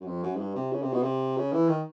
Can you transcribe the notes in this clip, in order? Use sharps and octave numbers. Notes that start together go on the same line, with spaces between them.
F#2
F2
F#2
G#2
G2
C3
C#3
C3
B2
C3
C#3
E3
D#3